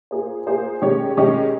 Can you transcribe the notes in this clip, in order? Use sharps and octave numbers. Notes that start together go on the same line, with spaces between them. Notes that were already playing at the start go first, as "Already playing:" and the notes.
A#3 F4 G#4 C5
A#3 F4 G#4 C5
D#3 G#3 C#4 G4 C#5
D#3 G#3 C#4 G4 C#5